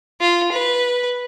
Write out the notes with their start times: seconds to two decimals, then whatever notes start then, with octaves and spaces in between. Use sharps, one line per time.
0.21 F4
0.52 B4